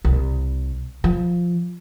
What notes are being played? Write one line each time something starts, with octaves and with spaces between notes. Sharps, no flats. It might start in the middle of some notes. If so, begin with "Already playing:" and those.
C2
F3